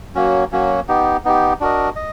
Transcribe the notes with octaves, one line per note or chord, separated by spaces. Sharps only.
F#3 A#3 C#4 F#4
F#3 A#3 C#4 F#4
B3 D#4 G4
B3 D#4 G4
D4 F#4 A#4 D#5
D#5